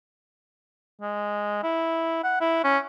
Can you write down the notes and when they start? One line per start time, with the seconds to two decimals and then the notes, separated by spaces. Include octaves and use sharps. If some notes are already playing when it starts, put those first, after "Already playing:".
1.01 G#3
1.63 E4
2.24 F#5
2.40 E4
2.64 C#4